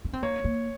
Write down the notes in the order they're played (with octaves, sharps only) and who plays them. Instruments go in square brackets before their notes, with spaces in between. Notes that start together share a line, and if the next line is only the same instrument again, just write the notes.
[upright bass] C#4
C4
[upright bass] A#3 [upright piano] C#5
[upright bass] A#3